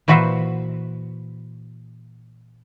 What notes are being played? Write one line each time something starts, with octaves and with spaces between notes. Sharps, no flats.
A#2 E3 F#4 B4 C5 E5